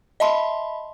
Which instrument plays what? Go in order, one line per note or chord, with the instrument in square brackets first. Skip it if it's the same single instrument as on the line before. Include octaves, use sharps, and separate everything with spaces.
[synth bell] D#5 E5 A5 B5 C6